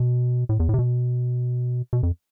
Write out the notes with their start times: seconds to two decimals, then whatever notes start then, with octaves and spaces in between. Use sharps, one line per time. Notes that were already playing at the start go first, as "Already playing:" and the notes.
Already playing: B2
0.49 A2
0.60 E2
0.69 A2
0.74 C3
0.79 B2
1.93 B2
2.03 F2